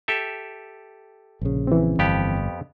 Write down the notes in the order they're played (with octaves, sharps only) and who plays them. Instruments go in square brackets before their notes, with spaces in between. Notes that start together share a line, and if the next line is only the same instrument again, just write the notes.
[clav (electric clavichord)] G4 A4 E5
[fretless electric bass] A#1 C#3
[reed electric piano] E3 C4
[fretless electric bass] G1 [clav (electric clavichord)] F2 B3 G4